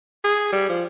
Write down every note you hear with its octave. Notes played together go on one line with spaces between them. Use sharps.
G#4
G3
F3